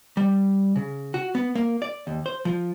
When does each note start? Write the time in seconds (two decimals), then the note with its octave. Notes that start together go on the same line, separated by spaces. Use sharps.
0.17 G3
0.76 C#3
1.14 F#4
1.35 B3
1.55 A#3
1.82 D5
2.07 D#2
2.26 C5
2.45 F3